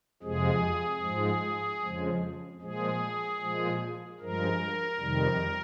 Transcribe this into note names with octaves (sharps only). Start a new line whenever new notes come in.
F2 C3 F3 G#3 G#4
G#2 F3 G#3
F2 C#3 F3 G#3
A#2 F3 G#3 G#4
A#2 F3 G#3
G2 F3 G#3 A#4
F2 C3 D#3 G3